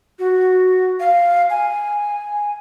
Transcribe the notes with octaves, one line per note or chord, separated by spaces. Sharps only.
F#4
F5
G#5